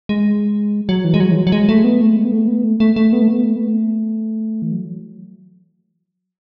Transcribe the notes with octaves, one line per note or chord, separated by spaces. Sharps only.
G#3
F#3
E3
G#3
F#3
E3
F#3
F#3
G#3
A3
B3
A3
G#3
B3
A3
B3
A3
A3
A3
B3
A3
B3
A3
B3
A3
E3
F#3